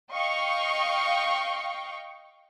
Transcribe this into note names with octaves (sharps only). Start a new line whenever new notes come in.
D#5 F5 G5 C#6